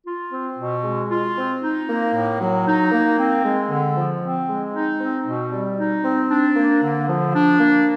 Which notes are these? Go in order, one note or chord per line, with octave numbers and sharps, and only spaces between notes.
F4
C4
B2
G#3
F4
C4
D#4
A#3
A2
F#3
D#4
A#3
C4
G#3
D3
F3
C4
G#3
D#4
C4
B2
G3
D#4
C4
D4
A#3
D3
F3
D4
A#3